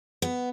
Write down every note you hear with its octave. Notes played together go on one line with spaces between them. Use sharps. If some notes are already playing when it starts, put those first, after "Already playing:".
B3